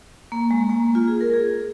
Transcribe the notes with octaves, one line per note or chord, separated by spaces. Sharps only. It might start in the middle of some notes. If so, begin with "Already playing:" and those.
A#3
G#3
G#3
A#3
A#3
F4
G#4
A#4
G#4